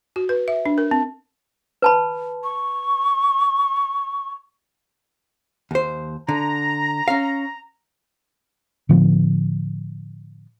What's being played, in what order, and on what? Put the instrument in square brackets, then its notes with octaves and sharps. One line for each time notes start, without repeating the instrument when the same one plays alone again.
[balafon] F#4
B4
E5
D4
A#4
C4
[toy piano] B4 A5 B5
[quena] C#6
[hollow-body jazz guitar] D#2 C5
[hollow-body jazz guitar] D3 [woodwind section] A#5
[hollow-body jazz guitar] C#4 F5
[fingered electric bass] A2 D3 F3 B3